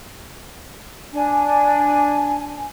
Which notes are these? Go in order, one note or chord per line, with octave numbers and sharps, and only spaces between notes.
D4 G#5